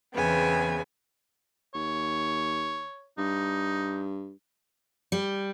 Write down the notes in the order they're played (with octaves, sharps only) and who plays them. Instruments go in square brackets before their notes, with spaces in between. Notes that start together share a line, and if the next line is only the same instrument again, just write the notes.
[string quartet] E2 C#3 B3 [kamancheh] C4 G#5
[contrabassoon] D#2 [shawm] C#5
[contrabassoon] G2 [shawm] D#4
[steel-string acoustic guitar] G3